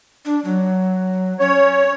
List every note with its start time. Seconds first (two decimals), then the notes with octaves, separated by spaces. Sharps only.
0.25 D4
0.44 F#3
1.40 C#4 C#5